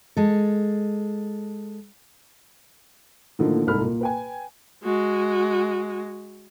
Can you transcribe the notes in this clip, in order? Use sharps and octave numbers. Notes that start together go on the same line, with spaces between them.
G#3 A4
A2 D3 D#3 F3 A#3
C2 G#2 A4 B5 F6
A#2
B4 G5 G#5
G#3 F#4